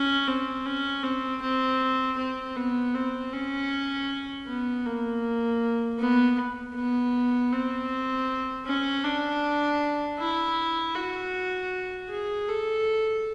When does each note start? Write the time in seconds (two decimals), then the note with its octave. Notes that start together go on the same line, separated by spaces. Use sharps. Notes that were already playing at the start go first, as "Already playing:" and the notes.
Already playing: C#4
0.28 C4
0.66 C#4
1.03 C4
1.42 C4
2.18 C4
2.57 B3
2.95 C4
3.33 C#4
4.48 B3
4.86 A#3
5.99 B3
6.75 B3
7.53 C4
8.66 C#4
9.04 D4
10.19 E4
10.95 F#4
12.09 G#4
12.48 A4